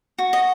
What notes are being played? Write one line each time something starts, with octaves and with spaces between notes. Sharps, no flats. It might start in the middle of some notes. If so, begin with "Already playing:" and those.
F#4
D#5